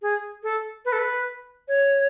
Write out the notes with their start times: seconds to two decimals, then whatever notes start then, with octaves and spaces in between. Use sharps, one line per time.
0.02 G#4
0.43 A4
0.85 B4
0.92 A4
0.99 B4
1.68 C#5